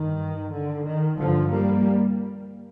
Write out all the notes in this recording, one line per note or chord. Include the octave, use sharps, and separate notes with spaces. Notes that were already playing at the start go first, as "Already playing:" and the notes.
Already playing: G2 D#3
D3
D#3
G2 D3 F3
G3 A#3